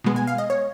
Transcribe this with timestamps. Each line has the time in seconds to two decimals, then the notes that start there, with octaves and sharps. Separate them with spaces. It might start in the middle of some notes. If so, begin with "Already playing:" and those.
0.04 B2 G#3 B3
0.16 G#5
0.27 F5
0.38 D#5
0.50 C#5